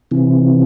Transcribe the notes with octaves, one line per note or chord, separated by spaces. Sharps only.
C3 E3